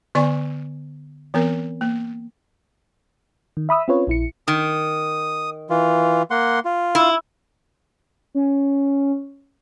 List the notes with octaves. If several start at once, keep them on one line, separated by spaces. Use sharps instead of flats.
D3 B3 D5 G#5 C#6
E3 B3 C4 A#4
A#3
D#3
E5 B5 D#6 E6
C4 C#4 F4 B4 C#5
A#1 E4 C#7
D#3 D#6
E3 F4
A#3 F#5 C6
F4
E4
C#4